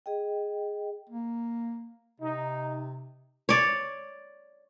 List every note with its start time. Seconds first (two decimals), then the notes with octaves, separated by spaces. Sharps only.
0.06 G#4 D#5 G5
1.10 A#3
2.20 C3 D#4
3.49 C#5 D5